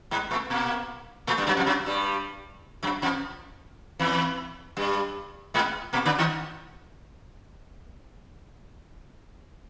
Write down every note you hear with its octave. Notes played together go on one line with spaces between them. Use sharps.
G#2 G#3
A2 A3
A#2 A#3
A2 A3
G2 G3
F#2 F#3
F2 F3
F#2 F#3
G2 G3
F#2 F#3
F2 F3
E2 E3
G2 G3
G#2 G#3
A#2 A#3
D3 D4
D#3 D#4